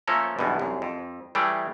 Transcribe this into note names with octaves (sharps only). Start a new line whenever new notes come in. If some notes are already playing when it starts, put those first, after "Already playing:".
F3 A3 A#3 C#4 A4 A#4
B1 E2 G2 B2
C2 F#2
F2
E3 G3 A3 G4 G#4 D5